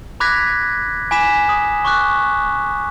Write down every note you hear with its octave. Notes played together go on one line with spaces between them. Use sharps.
B5 D6 F#6 G#6 A#6 B6
G#5 B5 D6 B6 E7
D#6
C#6 D6 F#6